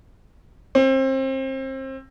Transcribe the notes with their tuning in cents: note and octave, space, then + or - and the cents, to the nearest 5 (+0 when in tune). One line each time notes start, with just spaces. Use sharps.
C4 +30